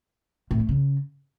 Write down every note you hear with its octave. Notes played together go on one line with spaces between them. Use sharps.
A2
A3
C#3